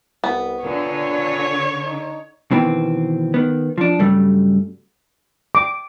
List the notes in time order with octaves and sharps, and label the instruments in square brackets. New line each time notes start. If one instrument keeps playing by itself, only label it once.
[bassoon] C2 [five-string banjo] B3
[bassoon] A#2 [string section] D3 [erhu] C#5
[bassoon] D#4
[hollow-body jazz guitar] B2 D#3 E3 B3 C4
D#3 B3
F3 D4
G2 C#3 F#3 G3 A3
[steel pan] D6